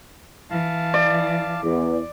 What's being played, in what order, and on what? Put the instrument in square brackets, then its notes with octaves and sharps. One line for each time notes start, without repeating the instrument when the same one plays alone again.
[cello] E3 [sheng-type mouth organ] F5 A5
[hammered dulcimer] D5
[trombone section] E2